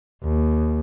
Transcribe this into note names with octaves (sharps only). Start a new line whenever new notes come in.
D#2